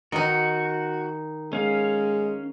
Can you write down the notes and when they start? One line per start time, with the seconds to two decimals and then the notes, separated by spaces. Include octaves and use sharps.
0.12 D#3 D#4 F#4
1.53 G#3 C#4 F5